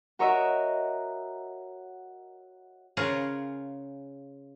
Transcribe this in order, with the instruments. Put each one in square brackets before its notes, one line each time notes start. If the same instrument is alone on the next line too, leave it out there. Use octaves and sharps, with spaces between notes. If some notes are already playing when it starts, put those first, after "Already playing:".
[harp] F#4 A#4 C#5 D#5 E5
[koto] C#3 F4 G#4 A#4 C#5